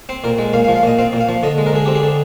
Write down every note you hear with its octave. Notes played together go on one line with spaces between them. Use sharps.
C4 C5
A#2 A#4
G#3
A#2 F5
F5
F3
F5
A#2 D#5
C4 F5
A#2
F5
F3
D3 D#5
G#3
A#4
D3 G#4
C4 G4
G#4
D3